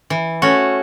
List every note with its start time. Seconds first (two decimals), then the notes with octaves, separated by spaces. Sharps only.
0.10 E3
0.42 A3 C#4 F#4